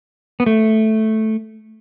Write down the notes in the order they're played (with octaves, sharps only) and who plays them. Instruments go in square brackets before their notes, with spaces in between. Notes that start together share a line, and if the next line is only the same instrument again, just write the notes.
[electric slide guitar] B3
A3